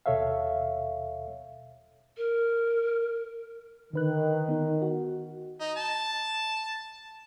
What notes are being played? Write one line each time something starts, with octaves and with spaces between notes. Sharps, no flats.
D#2 B2 A4 C#5 E5 F5
A#4
D3 D#3 B4 F#6
B3 D#4
F#4
D#4
A5